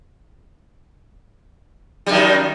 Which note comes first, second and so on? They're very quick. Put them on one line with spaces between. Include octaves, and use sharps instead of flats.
G3 F#2 D#3